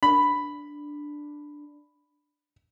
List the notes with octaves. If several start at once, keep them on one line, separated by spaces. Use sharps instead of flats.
D4 B5